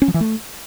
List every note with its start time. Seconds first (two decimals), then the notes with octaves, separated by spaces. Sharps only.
0.02 C#4
0.08 F3
0.14 E3
0.21 A3